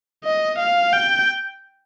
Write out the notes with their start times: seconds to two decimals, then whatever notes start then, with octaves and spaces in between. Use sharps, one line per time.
0.24 D#5
0.59 F5
0.93 G5